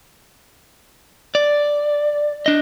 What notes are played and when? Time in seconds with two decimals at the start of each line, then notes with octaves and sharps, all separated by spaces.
1.35 D5
2.46 D4 D#5